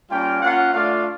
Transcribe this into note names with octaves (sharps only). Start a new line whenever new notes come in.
G3 A#3 C#4 F4 G5
A#3 C#4 F4 F#5
A3 D4 F4 F5